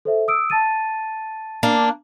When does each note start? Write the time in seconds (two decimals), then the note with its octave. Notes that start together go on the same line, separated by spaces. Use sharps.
0.05 A4 C5 E5
0.28 D#6 E6 D7
0.50 A5 A6 D#7
1.63 A#3 D4